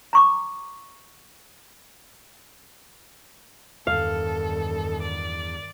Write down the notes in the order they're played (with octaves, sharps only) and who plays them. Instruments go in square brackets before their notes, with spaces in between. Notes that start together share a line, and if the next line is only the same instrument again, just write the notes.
[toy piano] A#5 C#6 D6
[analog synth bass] E2 [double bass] G2 D#3 [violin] A4 [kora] F5
[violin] D5